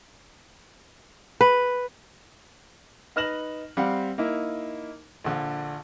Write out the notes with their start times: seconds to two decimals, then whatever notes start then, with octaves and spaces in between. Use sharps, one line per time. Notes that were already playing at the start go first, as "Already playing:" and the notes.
1.41 B4
3.16 D#4 B4 F6 A#6 E7 F#7
3.77 G3 C4 F5 F#5
4.18 A#3 D#4 E4
5.24 A#1 D3